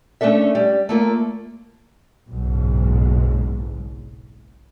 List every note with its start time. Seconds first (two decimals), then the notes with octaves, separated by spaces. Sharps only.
0.21 A3 C#4 D4 A4 E5
0.55 G3
0.89 A3 A#3 F4
2.31 F#1 B1 G#2